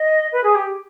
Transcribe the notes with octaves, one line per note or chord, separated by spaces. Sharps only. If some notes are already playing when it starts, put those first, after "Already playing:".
Already playing: D#5
B4
G#4
G4